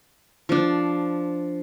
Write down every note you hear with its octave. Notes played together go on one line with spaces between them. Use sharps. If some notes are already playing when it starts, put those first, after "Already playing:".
F3 D4